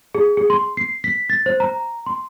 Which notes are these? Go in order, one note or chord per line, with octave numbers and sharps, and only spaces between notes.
G#4
G#4
C6
C7
B6
A6
C5
A#5
C6